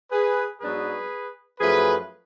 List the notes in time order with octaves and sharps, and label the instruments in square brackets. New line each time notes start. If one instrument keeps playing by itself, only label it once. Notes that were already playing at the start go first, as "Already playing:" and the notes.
[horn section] G#4 B4
G#2 F#3 B3 D4 G#4 B4
F#2 F3 A3 G#4 B4